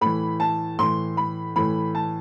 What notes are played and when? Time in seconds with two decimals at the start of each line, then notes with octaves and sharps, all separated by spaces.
0.01 A2 E3 B5
0.40 A5
0.79 A2 E3 C6
1.17 B5
1.56 A2 E3 B5
1.95 A5